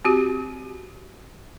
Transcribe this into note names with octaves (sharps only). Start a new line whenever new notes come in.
C4 F#4 G4